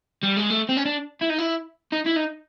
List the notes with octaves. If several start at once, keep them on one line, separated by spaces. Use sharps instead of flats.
G3
G#3
A3
C4
C#4
D4
E4
D#4
E4
D#4
E4
D#4